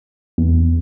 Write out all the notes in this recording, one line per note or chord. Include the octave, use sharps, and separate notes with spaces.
E2